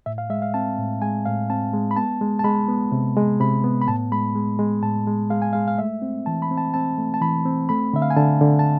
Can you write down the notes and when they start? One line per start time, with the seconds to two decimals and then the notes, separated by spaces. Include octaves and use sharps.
0.06 A2 E5
0.18 F5
0.30 G#3 E5
0.42 F5
0.54 C4 A5
0.78 A2
1.02 G#3 G#5
1.26 A2 F5
1.50 C4 A5
1.73 G#3
1.91 B5
1.96 B3 A5
2.21 G#3
2.39 A5
2.44 G#3 B5
2.68 B3
2.92 C3
3.16 G#3
3.40 C3 B5
3.64 B3
3.82 B5
3.88 A2 A5
4.11 G#3 B5
4.35 G#3
4.59 G#3
4.83 A2 A5
5.07 G#3
5.30 G#3 F5
5.42 G#5
5.53 G#3 F5
5.68 F5
5.78 A3 E5
6.02 C4
6.26 E3 A5
6.42 B5
6.51 C4
6.58 A5
6.74 C4 A5
6.98 A3
7.14 A5
7.21 E3 B5
7.45 C4
7.69 A3 B5
7.93 D3 E5
8.02 F5
8.10 G#5
8.17 D3 A5
8.41 D3
8.59 A5